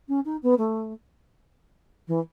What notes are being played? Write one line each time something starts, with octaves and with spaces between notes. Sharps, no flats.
C#4
D#4
B3
A3
E3